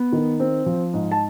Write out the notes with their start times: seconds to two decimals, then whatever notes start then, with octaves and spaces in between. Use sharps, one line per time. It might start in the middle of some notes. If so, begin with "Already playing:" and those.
Already playing: B3
0.13 D#3
0.40 C4
0.66 F3
0.94 G#2
1.12 A5